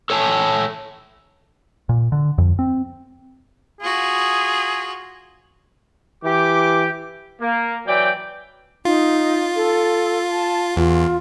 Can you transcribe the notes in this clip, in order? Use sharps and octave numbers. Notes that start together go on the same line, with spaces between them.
A4 C#5 G#5 A5
A#2
D3
F2
C4
F4 F#4 G#4
E3 G4 D6
A#3
E3 F#3 D5 G5
D#4 F4
A4
A5
E2 F4